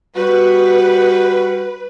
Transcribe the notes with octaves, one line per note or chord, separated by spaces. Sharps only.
G3 F#4 B4